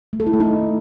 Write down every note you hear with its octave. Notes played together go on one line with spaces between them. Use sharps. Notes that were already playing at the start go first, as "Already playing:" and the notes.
A3
A4
E4
A3
D#4